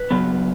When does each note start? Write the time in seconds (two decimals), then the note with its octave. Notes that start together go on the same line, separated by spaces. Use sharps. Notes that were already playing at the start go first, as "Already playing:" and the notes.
Already playing: B4
0.11 C#3 F#3 B3